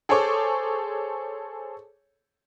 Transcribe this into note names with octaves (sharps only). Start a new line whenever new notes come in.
G#4 A4 C5 C#5 C#6 D6